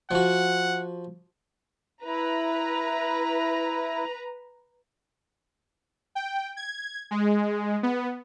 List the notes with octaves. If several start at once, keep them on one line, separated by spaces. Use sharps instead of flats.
F3 F#4 F#5
E4 B4 A#5
G5
G#6
G#3
B3